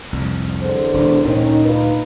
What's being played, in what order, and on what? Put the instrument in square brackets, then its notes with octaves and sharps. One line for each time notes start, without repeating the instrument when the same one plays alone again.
[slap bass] C2 F2
[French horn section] E2 D3 C5
[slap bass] E1 D4
[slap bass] D2 G2 A#2 [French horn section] D#3 C#4 D#4
[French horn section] D#4 F4 B4